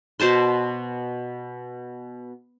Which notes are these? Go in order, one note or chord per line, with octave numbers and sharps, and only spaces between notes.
B2 C5 A5 C6